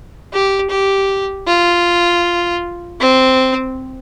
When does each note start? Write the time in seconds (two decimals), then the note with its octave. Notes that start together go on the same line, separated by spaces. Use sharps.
0.33 G4
0.70 G4
1.47 F4
3.00 C4